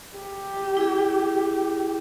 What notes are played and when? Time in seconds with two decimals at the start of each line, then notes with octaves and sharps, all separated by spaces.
0.17 G4
0.77 E4 G#4